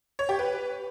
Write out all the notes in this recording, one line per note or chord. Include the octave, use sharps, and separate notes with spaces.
C#5
G4
B4